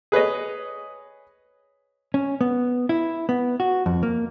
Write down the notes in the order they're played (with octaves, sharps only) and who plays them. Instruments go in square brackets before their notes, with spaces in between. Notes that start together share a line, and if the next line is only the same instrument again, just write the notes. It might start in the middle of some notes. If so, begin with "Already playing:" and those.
[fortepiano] G#4 B4 C#5 D#5
[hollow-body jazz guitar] C#4
B3
E4
B3
F#4
F2
A#3